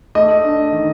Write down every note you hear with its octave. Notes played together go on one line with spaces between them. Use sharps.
A3 D#5
D4
D#3